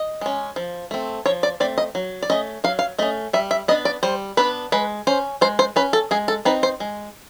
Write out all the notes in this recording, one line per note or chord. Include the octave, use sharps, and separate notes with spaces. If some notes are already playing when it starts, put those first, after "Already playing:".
Already playing: D#5
G#3 C#4
F3
A3 C4
F3 C#5
D5
A3 C4 D5
D#5
F#3
D5
A3 C#4 D#5
F#3 F5
F5
A3 C#4 D#5
G3 E5
E5
B3 D4 D#5
D5
G3 C5
B3 D4 B4
G#3 B4
C#4 C5
G#3 C5
C5
C#4 B4
A4
G#3 G#4
A4
C4 D#4 B4
C5
G#3